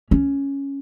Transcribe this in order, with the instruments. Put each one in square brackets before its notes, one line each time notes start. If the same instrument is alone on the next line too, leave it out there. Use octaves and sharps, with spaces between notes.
[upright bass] C#4